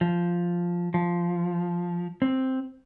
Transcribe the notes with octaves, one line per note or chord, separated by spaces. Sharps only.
F3
F3
C4